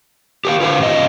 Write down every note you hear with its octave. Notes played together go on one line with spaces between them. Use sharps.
G4 A#4 F5
F4 B4 C5 F5
G#2 C#3 D#5